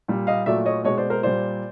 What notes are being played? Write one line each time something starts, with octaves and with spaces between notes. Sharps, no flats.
A#2 G3
D#5 F5
A#2 F#3 A3 D5 E5
C#5 D#5
B2 G#3 C#5 D#5
C5 D5
A#4 C5
A#2 G3 C5 D5